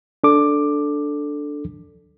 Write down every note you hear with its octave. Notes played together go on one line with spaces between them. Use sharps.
D4 A4 D6